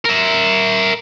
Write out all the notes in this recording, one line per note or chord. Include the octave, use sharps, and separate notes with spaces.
A#4 E5